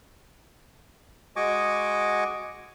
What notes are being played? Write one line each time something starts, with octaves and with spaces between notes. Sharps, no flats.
G#3 F#4 D#5 G#5 C#6 D6